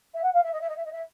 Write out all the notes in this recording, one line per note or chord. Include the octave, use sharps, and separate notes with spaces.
E5
F#5
F5
E5
D#5
E5
D#5
E5
D#5
E5